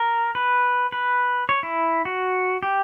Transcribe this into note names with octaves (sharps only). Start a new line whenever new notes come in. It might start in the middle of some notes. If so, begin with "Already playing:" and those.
Already playing: A#4
B4
B4
C#5
E4
F#4
G4